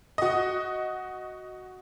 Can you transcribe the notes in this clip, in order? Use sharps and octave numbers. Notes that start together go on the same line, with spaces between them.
F#4 D#5